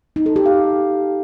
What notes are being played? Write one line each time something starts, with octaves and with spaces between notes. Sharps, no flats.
D#4
A4
G4
F5